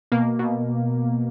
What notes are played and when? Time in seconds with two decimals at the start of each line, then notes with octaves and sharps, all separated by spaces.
0.12 B2 A#3
0.39 B2